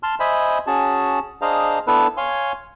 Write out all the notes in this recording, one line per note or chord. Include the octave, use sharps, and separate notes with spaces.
A5 C6 F6
C5 D#5 E5 G#5 B5
C#4 F#4 G#4 A5
D4 G#4 C5 D#5 F5 A#5
B3 D4 E4 A4 B4
C#5 F5 G#5 C6